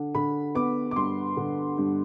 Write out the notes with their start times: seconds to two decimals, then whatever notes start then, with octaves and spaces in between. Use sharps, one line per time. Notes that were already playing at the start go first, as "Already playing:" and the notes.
Already playing: D3
0.15 D3 B5
0.55 B3 D6
0.91 D6
0.96 G2 C6
1.37 D3
1.78 G2